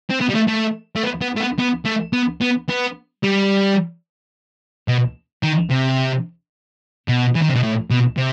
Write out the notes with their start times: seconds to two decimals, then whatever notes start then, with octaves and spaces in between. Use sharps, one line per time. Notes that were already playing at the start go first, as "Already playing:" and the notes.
0.10 C4
0.21 B3
0.30 G3
0.35 A3
0.48 A3
0.96 A3
1.03 B3
1.21 B3
1.36 A3
1.40 B3
1.59 B3
1.85 A3
2.13 B3
2.41 B3
2.69 B3
3.23 G3
4.88 B2
5.43 D#3
5.70 C3
7.08 B2
7.35 E3
7.42 D#3
7.49 C3
7.55 B2
7.63 A2
7.90 B2
8.17 C3